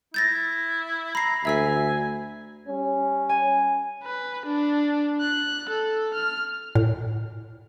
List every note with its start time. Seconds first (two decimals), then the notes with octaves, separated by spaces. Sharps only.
0.14 E4 G6 A6 A#6
1.15 A#5 B5 C7
1.45 D2 E5 G#5 E6 B6
2.68 G3 C#4
3.29 G#5
4.03 B4
4.46 D4
5.21 F#6
5.70 A4
6.14 F6
6.75 A2